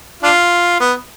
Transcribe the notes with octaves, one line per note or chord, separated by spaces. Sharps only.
D4 F4
B3